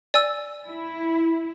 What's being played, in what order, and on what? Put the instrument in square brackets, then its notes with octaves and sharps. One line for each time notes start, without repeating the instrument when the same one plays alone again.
[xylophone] D5 G#5 E6
[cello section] E4